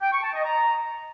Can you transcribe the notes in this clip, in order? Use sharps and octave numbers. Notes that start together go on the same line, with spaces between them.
G5
C#6
A5
D#5
A#5